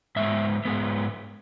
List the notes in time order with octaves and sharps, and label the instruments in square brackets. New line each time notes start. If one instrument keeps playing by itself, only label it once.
[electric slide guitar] G#2 G#3 B3 E5
G#2 G#3 B3